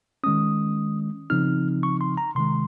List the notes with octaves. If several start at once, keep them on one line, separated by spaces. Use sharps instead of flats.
D#3 G#3 C#4 D#6
C#3 F3 C4 D#4 F6
C#6
C6
A#5
C3 D#3 G#3 C6